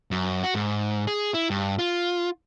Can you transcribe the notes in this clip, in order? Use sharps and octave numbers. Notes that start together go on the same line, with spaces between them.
F#2
F#4
G#2
G#4
E4
G2
F4